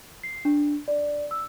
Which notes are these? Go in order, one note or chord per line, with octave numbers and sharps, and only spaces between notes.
C7
D4
D5
E6